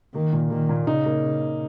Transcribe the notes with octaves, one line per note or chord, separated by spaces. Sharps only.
D#3 A#3
A#2
D#3 A#3
A#2
C#3 D#4
A#3